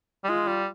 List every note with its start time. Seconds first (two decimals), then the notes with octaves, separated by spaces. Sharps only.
0.24 G3
0.29 G#3 F4
0.48 G3